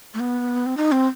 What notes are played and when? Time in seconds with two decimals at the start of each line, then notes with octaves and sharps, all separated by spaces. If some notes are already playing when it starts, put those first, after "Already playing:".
0.14 A3
0.20 B3
0.66 C4
0.77 D#4
0.92 C4